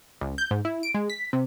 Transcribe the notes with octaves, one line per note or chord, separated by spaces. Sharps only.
C#2
G6
G#2
E4
D7
G#3
B6
C3